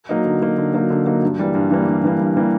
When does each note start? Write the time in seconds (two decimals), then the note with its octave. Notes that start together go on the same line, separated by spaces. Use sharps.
0.09 F#3 A#3 D#4
0.25 D3
0.42 F#3 A#3 D#4
0.58 D3
0.74 F#3 A#3 D#4
0.90 D3
1.06 F#3 A#3 D#4
1.23 G2
1.39 E3 G3 A#3
1.55 G2
1.71 E3 G3 A#3
1.88 G2
2.04 E3 G3 A#3
2.20 G2
2.36 E3 G3 A#3